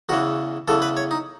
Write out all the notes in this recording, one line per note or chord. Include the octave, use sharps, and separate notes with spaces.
E2 C#3 E3 F#4
E2 C#3 E3 A4
B4
C#5
D#4